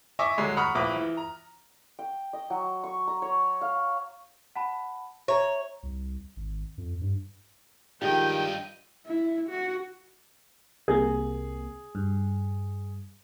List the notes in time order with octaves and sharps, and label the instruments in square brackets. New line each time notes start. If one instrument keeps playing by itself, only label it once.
[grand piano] D#5 E5 G#5 C#6 D6 E6
D#1 D3 F#3 G#3 D6
F#5 A#5 B5 C#6 D#6 F6
A#1 E4 B4 D6 D#6
E3
A#5
[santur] G5
D#5
F#3
C#6
A#5
C#5
F5
[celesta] F#5 A5 B5
[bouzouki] C#5 [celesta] E5 A#5
[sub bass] C2
G#1
F2
G2
[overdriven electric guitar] G2 D#5 [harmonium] D#3 [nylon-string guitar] F3 G#3 G4 [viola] G5
[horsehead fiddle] E4
F#4
[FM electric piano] C2 C3 A#3 [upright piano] G#4
[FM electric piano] G2